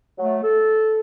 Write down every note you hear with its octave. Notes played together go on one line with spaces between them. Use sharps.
F#3 A3
A4